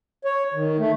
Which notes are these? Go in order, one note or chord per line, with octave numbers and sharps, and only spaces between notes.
C#5
D#3
A3